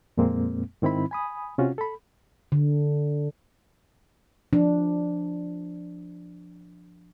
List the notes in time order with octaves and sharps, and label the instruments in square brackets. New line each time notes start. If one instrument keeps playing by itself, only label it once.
[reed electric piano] F2 A#2 G#3 A#3 C4
G#2 D#3 C4 E4 B5
G#5 B5 D#6
C3 C#4 F4 F#4
A4 B5
[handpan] D3
F3 D4